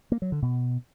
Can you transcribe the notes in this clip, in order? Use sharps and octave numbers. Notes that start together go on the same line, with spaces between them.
A#3
F#3
D3
B2